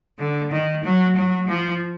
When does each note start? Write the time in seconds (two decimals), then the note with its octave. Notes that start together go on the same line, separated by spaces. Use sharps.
0.19 D3
0.51 D#3
0.84 F#3
1.16 F#3
1.48 F3